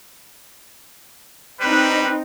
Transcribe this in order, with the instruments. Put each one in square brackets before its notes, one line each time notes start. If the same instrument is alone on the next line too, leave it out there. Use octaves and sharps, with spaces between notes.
[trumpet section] G3 B4 [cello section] C4 D#4